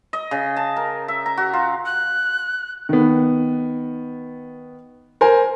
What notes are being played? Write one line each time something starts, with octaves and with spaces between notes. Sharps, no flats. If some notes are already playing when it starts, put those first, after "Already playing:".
D#5
C#3
A5
A#4
E5
A#5
F#4
F4
F#6
D#3 B3
A#4 C5 G#5